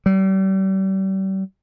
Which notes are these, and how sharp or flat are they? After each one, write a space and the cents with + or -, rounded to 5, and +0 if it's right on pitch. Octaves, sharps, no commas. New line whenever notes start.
G3 -35